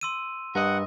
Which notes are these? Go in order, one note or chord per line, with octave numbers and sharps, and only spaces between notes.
C6 E6 D#7
G2 A#4 D#5 F#5